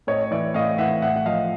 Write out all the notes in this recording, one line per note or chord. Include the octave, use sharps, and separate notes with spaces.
A2 C#5 D#5
E3 D5 E5
A2 D#5 F5
E3 E5 F#5
A2 E5 F#5
F#5
F3 D#5 F5